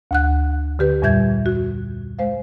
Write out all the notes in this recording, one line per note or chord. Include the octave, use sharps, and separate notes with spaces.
D2 F#5 F#6
D3 G4 B4
F2 A#2 G3 E5 G6 G#6
F#4
G#3 C5 F5